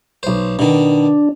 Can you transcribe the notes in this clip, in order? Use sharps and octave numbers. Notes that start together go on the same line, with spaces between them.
B1 C5
B2 D#3 D4